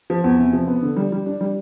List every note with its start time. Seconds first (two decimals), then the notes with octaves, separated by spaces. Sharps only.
0.10 F3
0.24 E2
0.38 C3
0.53 F3
0.68 B3
0.82 D3
0.97 G3
1.12 G3
1.26 D4
1.41 G3